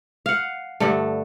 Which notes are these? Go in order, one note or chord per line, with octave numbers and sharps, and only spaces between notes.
F5 F#5
G2 D3 A3